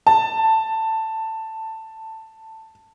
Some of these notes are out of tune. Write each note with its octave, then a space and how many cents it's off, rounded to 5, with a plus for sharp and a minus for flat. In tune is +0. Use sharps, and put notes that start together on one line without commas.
A5 +10